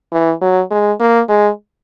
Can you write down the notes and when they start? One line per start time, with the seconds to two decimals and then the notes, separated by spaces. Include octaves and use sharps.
0.12 E3
0.41 F#3
0.71 G#3
1.00 A#3
1.29 G#3